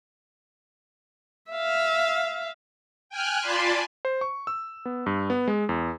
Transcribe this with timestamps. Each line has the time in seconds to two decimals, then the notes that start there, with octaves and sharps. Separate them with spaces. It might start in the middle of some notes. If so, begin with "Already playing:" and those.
1.52 E5 F5
3.09 G5 G#5 F6 F#6
3.41 F4 D5 G#5 A5 B5 C6
4.05 C5
4.21 C#6
4.47 E6
4.85 B3
5.06 G2
5.30 B3
5.48 G#3
5.69 E2